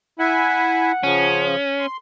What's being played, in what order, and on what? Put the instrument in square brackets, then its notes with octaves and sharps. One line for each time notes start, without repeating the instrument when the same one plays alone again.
[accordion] E4 E5 G#5 [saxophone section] F#5
[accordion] C#3 F3 [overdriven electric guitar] C#4
[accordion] C6